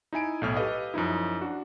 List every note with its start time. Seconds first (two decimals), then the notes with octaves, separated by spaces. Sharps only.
0.13 D#4 E4 G#5 D7
0.42 B1 A2 F6
0.56 G4 A4 B4 D#5 F5
0.94 F#2 F3 D#4 E4
1.41 D4 F#4